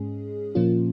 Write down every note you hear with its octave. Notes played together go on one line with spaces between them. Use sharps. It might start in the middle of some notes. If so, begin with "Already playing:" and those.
Already playing: G#2 G#3 C#4 G#4
A#2 F3 A#3 C#4 F4